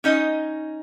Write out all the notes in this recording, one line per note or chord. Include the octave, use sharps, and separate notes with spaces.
C#4 D#4 D#5